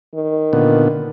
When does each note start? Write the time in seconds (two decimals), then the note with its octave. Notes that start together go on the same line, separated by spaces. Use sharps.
0.14 D#3
0.53 A#2 D3 B3